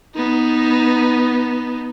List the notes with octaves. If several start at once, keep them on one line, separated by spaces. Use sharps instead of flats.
B3 D#4